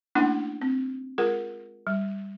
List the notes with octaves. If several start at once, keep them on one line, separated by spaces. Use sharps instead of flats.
A3 A#3 C#4 D4 E4 F#5
C4
G#3 F4 G#4 A#4
G3